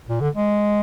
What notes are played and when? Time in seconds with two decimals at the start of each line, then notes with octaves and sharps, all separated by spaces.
0.08 A#2
0.21 D3
0.34 G#3